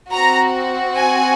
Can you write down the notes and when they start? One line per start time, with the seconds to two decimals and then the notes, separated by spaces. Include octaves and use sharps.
0.12 C4 F#4 A#5
0.95 G#5